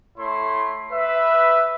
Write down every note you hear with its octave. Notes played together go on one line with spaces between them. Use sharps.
A3 E4 C#5 C6
B4 E5